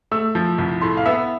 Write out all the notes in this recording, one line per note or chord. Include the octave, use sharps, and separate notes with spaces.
A3 E6
F3
C2
A2 C6
F5
B3 E5